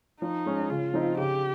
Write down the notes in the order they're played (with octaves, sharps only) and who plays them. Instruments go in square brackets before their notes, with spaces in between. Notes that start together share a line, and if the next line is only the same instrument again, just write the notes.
[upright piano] F3 [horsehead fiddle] D#4
[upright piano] G#3 C#4
[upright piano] C#3 [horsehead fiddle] F4
[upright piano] F3 C4 D#4
[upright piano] C#3 [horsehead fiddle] G4